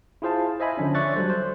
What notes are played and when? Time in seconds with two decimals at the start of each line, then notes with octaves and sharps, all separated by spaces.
0.22 E4 F4 G#4 C5 F5 A5
0.60 C5 D#5 E5 G#5 B5
0.77 D3 F3 C#4 D4
0.95 C#5 D5 E5 C#6 F#6 A6
1.16 F#3 G3 A4 C5
1.30 C5